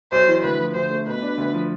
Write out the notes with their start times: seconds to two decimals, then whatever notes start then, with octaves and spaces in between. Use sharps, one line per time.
0.12 B1 C5
0.28 E3
0.43 D2 B4
0.59 F3
0.74 D2 C5
0.90 A3
1.07 B2 B4
1.22 D4
1.38 D2
1.54 F3